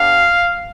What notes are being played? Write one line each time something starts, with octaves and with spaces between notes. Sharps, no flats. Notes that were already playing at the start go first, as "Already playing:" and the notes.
Already playing: B3 D4 G4 F5